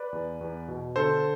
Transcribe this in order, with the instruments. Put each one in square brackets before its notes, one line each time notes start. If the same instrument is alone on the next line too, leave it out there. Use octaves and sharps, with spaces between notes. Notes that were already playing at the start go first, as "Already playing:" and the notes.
Already playing: [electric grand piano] B4 D5
E2
E2
B2
D3 A4 C5